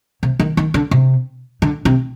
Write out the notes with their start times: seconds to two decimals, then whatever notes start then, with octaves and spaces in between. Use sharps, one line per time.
0.23 C3
0.40 D#3
0.57 D#3
0.74 D3
0.91 C3
1.62 D3
1.85 C3